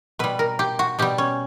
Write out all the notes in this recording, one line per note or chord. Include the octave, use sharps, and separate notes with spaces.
B2 G3 B4
A#4
G4
F#4
B2 G3 G4
C#4